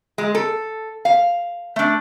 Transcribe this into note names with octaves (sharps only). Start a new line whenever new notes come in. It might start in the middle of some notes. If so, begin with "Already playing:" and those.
G#3
A4
F5
A3 D4